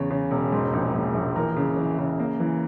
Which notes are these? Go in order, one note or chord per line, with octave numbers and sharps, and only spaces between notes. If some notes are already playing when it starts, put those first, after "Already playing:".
Already playing: E2 C#3 C#5
C#3
E1
G#2
A#1
A#1
A#1
E3 A#4
C#3
E3
C#3
A#3
E3